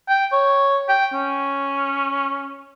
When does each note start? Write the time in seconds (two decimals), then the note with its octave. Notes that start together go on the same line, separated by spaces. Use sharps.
0.09 G5
0.32 C#5
0.89 G5
1.13 C#4